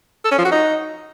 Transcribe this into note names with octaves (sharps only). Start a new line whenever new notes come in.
A4
C#4
F3
F#4
D#4